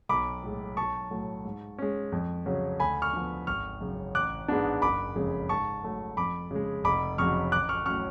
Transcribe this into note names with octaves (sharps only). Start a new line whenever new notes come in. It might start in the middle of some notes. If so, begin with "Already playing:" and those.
B1 B5 D6
A2 G#3
B1 A5 C#6
A2 F#3 A3
G#2
G#3 C#4
F2
C#3 F#3 C#4
D2 G#5 B5
C#6 F6
D3 F3 B3
G#1 C#6 F6
F#2 C#3
A1 D6 F#6
G#2 G#3 B3 D4
F#1 B5 D6
F2 C#3 G#3
G#2 A5 C#6
F#3 A3
F2 B5 D6
C#3 G#3
F1 B5 D6
F2 C#3 F#3 C#6 F6
A1 D6 F#6
C#6 F6
A2 F#3 C#4 C#6 F6